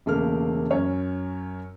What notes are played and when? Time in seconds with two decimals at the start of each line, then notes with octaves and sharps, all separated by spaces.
0.06 E1 C#3 A3 A#3 A#4 F6
0.70 F#2 C#4 C#5